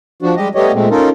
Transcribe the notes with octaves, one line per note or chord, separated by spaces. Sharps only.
F3 D4 F#4
G3 G#3 G4 D#5
G3 A3 B3 G4 C#5 D#5
A#2 G#3 A3 C4
C#4 D#4 F4 A4 A#4